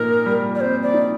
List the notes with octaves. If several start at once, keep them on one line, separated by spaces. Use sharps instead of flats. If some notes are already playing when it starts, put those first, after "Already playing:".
Already playing: A#2 D#4 A#4
G3
D5
C4 C5
D5
D#4